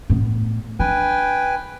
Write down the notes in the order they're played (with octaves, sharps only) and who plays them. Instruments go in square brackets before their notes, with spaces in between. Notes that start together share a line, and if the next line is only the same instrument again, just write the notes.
[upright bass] A2 B3
[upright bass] D4 [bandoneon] B4 G5 G#5